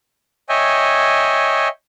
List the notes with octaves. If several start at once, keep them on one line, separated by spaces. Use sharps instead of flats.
C#5 D#5 E5 G5 G#5